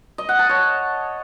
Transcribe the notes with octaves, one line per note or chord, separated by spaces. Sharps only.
D#5
F#5
A5
C#5